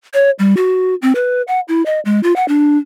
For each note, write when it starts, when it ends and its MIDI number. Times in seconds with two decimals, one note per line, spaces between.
0.14 0.30 73
0.39 0.54 55
0.57 0.95 66
1.02 1.12 60
1.15 1.42 71
1.48 1.60 78
1.68 1.84 64
1.86 2.00 75
2.05 2.20 56
2.23 2.35 65
2.36 2.45 78
2.48 2.77 62